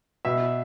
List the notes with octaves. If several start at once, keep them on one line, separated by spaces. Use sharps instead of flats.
B2 E5